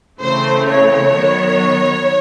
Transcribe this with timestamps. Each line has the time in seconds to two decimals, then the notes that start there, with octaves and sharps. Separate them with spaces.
0.21 C#3 E3 A3 C4 C5
0.68 C#5
1.15 D#3 F#3 B3